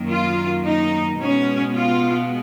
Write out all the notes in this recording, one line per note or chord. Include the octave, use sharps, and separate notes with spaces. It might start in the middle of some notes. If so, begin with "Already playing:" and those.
Already playing: F#2 D#3 A#3
F4
D#4
B2 G#3 B3 C#4
F4